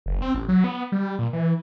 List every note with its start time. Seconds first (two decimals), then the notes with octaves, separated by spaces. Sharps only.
0.06 F#1
0.22 C4
0.35 A1
0.49 F#3
0.64 B3
0.92 G3
1.19 A#2
1.33 E3